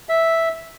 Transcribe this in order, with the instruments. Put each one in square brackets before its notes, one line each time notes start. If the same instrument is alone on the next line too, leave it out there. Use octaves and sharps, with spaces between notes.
[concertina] E5